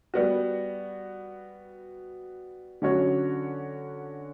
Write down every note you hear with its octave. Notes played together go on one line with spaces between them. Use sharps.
G3 B3 F#4
D3 F#3 C#4 F#4 C#5